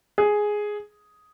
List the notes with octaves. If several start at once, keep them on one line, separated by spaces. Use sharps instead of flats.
G#4